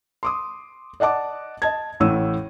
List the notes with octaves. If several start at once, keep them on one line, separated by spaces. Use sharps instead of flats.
C6 D6 D#6
D5 D#5 F#5 A5 D6
D#5 A5 G#6
A1 A2 E3 E6 D#7